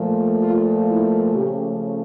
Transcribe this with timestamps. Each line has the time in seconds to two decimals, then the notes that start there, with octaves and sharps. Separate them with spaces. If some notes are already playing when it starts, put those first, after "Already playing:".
Already playing: A#2 F3 A3
0.41 F4
0.89 E4
1.35 C#3 F3 A3 C#4 G4